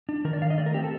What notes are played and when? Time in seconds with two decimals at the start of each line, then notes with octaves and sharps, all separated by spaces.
0.09 D4
0.25 D#3 A#4
0.33 D5
0.42 D#3 F5
0.50 D#5
0.58 A3 D5
0.66 A#4
0.74 C4 G4
0.84 A4